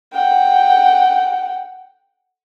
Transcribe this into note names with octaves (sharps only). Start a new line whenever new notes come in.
F#5 G5